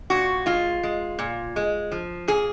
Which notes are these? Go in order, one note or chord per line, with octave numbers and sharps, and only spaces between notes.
A#2 F#4
G#3 F4
G#3
A#2
G#3
F3
A#2 G#4